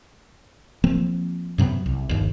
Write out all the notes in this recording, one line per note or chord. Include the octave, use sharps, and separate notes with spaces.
F3 A#3 C4
F#2 C3 F#3 B3
C2
G1 D#2